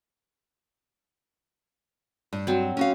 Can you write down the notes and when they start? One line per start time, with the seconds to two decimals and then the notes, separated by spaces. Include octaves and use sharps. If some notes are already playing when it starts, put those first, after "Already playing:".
2.33 G2
2.47 F#3 C4
2.77 C#4 F#4 F5